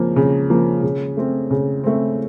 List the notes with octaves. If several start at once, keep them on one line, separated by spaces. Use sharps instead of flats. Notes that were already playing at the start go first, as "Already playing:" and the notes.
Already playing: C#3 F3 A#3
C#3
F3 A#3
C#3
A3 C4
C#3
A3 C4